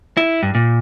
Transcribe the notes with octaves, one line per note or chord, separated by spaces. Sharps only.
E4
G2
A#2